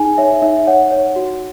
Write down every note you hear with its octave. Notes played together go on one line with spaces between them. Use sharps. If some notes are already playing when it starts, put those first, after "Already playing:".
Already playing: D#4 G#4 G#5
C#5 E5
D#4 E5
C#5 F#5
C#5
F#4